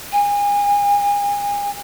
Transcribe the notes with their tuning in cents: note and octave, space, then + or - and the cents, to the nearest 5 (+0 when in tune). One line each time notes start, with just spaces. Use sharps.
G#5 -35